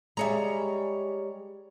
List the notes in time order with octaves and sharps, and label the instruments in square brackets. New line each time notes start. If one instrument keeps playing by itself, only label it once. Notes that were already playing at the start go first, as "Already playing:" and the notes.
[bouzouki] G3 C#5 A#5 [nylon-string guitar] G#3 G#4 E5